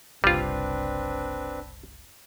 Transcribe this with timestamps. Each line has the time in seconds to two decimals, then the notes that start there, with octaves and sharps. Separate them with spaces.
0.24 F#1 C2 G3 C4 D4 F4 B4